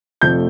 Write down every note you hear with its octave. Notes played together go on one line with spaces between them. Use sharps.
F1 F2 F3 A3 G6